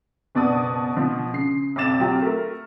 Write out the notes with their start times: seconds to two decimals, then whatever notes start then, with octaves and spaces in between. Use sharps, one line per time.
0.35 F#1 B2 B3 D5 A5 D#6
0.97 B2 F3
1.33 C#3 C7
1.76 B1 F2 C4 D6 A6 E7
2.00 F#3 C4 F4 G4
2.22 A3 A#4